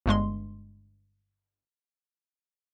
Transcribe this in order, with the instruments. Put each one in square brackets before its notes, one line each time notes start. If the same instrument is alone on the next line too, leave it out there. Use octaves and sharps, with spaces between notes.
[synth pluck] G1 G2 G#3 C6